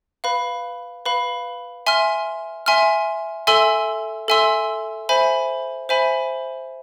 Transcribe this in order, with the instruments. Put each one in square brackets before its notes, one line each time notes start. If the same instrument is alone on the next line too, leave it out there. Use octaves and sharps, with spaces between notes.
[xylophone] B4 F5 B5
B4 F5 B5
E5 G#5 C6 F6
E5 G#5 C6 F6
A4 E5 G#5 C6 E6
A4 E5 G#5 C6 E6
C5 E5 G#5 B5
C5 E5 G#5 B5